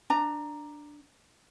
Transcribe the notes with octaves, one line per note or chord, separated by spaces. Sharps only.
D4 A#5